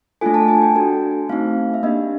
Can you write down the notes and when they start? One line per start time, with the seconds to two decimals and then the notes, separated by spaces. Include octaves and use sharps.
0.21 A3 D4 F4 A4 G#5
0.34 A5
0.48 G#5
0.62 G5
0.76 D4 F#4 A4
1.29 A3 C4 D#4 F5
1.74 E5
1.83 A#3 D4 G4 D#5